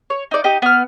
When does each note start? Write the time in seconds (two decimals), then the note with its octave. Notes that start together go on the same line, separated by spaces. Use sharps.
0.10 C#5
0.31 D#4 D5
0.44 D#4 G4 D#5
0.62 B3 F6